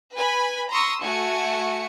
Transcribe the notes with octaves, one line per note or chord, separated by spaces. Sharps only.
B4 G#5 B5
A#5 C6 C#6 D#6 E6 A#6
A3 F#4 G#5 C#7